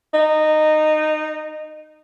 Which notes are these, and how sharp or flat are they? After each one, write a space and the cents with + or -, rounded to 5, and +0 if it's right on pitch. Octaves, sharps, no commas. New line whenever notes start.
D#4 -15